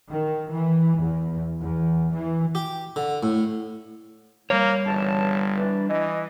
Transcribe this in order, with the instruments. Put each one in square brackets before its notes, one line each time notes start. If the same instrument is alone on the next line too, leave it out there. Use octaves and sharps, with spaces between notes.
[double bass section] D#3
E3
E2
E2
E3
[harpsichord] G4
D3
A2
[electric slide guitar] G3 C#5 [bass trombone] A#3
[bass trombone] G1 [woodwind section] C#3 E3 A5
[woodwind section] E3 D4
[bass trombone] E3 [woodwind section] D#5